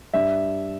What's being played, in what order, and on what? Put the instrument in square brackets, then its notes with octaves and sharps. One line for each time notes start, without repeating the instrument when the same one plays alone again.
[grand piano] G2 E5